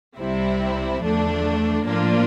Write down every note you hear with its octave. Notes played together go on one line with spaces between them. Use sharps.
C2 C3 G3 C4 E4
E2 D3 F3 A3 D4
A2 F3 A#3 D4 F4